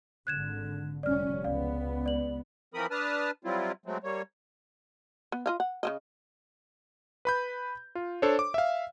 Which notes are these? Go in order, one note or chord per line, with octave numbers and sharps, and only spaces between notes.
G#1 D3 F#6 G#6 E7
F1 G3 C#4 D5 F6
C#2 B3 D5 F5
D5 F#7
E3 F3 C4 A#4 B5 D#6
D4 B4 A5 D#6 F6
F#3 G3 C4 E4 F4
F#3 G#3 A3 C4
G3 A#3 C#5
B3
F4 D#5 F5
F#5
C#3 A#3 D#5
B4 B5 G6
F4
D4 A4 C5 C#5
D6
E5 F5